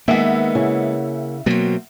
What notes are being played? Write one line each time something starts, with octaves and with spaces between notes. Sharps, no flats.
D#3 G#3 A#3 B3 E5 F#5
C#3 E4 G#4
B2 F#3 A#3 C4